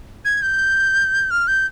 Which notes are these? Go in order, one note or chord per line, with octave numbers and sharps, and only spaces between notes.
G#6
G6
F6
G6